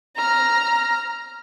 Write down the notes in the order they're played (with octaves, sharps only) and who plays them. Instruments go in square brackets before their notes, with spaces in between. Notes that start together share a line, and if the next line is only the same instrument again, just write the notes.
[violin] A#5 F6